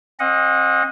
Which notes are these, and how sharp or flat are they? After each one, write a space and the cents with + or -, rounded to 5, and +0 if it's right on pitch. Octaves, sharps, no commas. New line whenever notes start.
C4 +35 D#5 +0 F#5 -30